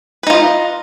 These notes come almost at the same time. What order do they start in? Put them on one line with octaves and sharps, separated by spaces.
B4 D#4 F4 D#5